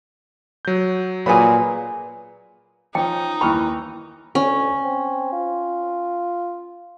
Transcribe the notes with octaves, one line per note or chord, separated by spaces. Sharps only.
F#3 G6
A#2 F#3 B3 G#4 B5
F3 C#4 D#4 G5
D#2 E3 G5 B5 C#6 F6
D2 C#4
C4
F4